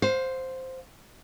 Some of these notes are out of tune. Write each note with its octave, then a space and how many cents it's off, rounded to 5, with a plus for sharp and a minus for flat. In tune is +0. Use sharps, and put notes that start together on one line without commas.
C5 +0 F5 +30